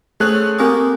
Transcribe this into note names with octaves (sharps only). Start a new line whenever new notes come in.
A3 C4 C#4 G#4 F#6
A#3 C4 G4 G#5 D#6